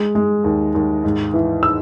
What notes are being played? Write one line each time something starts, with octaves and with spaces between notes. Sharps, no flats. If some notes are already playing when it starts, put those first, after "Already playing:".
Already playing: G#3
G#3
D#2
D#2
G#2
E3
E6